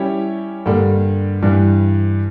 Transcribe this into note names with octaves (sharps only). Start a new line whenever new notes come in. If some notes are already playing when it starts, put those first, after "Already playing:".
Already playing: G3 C#4 E4 G4 C#5
G2 D3 G3 A#3
G2 E3 G3